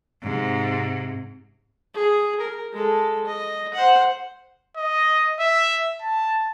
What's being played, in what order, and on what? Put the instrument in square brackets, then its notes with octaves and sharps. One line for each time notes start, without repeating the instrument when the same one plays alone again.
[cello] G#2 C3
[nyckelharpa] G#4
A#4
G#3 A4
D#5
C5 F#5
[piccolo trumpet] D#5
E5
A5